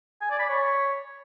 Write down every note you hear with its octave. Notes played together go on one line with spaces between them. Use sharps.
G#5
D5
B5
C#5